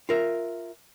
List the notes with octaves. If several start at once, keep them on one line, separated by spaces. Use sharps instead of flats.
F4 A#4 E5